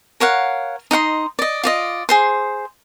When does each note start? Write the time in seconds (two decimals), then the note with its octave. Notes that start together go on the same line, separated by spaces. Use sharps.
0.20 A#4 C#5 F5 F#5
0.91 D#4 D#5 F#5 C6
1.39 D5 D#5
1.63 F4 D5 D#5
2.09 G#4 C5 C6